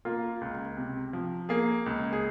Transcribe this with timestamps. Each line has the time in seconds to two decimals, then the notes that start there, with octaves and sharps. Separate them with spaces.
0.05 A#3 F4
0.41 C#2
0.77 C3
1.13 F3
1.49 A#3 G#4
1.86 C#2
2.13 G#4